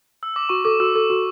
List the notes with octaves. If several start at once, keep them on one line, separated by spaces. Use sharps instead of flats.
E6
D6
F#4 C#6
A4 D6
F#4 E6
A4
F#4